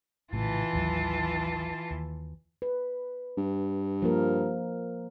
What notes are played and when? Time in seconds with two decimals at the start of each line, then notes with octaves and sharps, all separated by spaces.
0.33 A#1 A2 C#3 E3 F4 A5
0.73 A1 D#2 F#3
1.91 D#2
2.62 B4
3.37 G2
4.02 F3 A#3 A#4